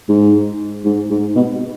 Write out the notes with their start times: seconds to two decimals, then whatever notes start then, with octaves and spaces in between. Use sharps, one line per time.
0.09 G#2
0.85 G#2
1.10 G#2
1.36 B2